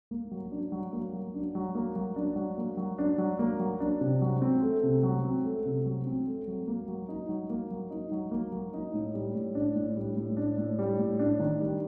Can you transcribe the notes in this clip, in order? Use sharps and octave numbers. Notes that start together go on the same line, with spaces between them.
A#3
F#3
D4
F#3
A#3
F#3
D4
F#3
A#3
F#3
D4
F#3
A#3
F#3
D4
F#3
A#3
F#3
D4
C3
F#3
C4
A3
C3
F#3
C4
A3
C3
F#3
C4
A3
F#3
A#3
F#3
D#4
F#3
A#3
F#3
D#4
F#3
A#3
F#3
D#4
A2
G3
A2
D4
A2
G3
A2
D4
A2
G3
A2
D4
D#3
G3